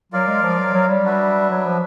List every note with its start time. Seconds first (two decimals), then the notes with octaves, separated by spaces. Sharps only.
0.12 F#3 F4 A#4 D5 F5
0.28 G#3
0.43 F3
0.58 F#3
0.74 F#3
0.89 G3
1.04 D4 F#4 B4 E5
1.50 F#3
1.66 F3